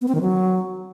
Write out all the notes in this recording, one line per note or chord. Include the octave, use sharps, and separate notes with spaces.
B3
C4
D#3
F#3